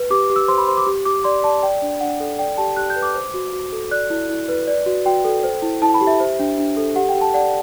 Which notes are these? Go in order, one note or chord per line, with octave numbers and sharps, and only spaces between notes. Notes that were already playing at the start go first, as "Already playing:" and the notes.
Already playing: B4
G4 D6
G4
E6
C5 C6
B5
C5 C6
D6
G4
G4 D6
D5 C6
D5 A5
D5 G5
D4
D4 F#5
A4
D5 G5
G4 A5
G4 F#6
G6
B4
D6
C5
F#4
F#4
A4
D5 F#6
E4
E4
B4
D5
F#4
F#4 G5
A4
C5
E4
E4 A5
B5
G4
E5
C5
D4
D4
A4
G4 F#5
G5
G4
A5
D5 F#5